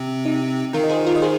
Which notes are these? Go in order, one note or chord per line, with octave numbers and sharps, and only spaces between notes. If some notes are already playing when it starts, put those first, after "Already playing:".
Already playing: C3 C4
D#4
D#3 D#4 F4 A#4
D#5
G#4 C5
F4 A#4
D#5
G#4 C5